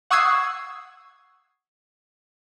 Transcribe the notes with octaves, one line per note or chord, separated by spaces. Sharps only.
F#5 C#6 D#6 E6 G#6 C7